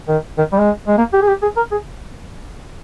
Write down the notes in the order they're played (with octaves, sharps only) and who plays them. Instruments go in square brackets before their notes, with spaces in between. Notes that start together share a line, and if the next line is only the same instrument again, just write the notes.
[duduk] D#3
D#3
G3
G#3
G#3
A#3
G4
G#4
G4
G#4
A#4
G#4